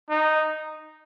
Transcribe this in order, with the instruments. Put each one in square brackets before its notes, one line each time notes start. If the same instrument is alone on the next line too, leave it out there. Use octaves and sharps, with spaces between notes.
[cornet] D#4